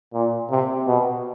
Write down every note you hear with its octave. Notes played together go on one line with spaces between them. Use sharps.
A#2
C3
B2